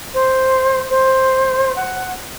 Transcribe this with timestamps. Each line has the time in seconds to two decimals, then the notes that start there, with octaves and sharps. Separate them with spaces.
0.14 C5
0.90 C5
1.76 F#5